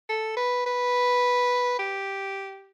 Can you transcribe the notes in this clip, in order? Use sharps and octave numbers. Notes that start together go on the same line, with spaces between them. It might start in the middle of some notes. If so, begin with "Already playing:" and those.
A4
B4
B4
G4